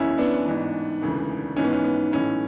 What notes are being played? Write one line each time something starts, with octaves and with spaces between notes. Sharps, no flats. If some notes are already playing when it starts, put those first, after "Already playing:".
Already playing: F#1 E2 C#3 C#4 E4
B3 D4
A1 G#2 E3
E1 D2 C#3 E3
G#1 G#2 E3 C#4
B3
C#4
B3
B1 A2 E3 C#4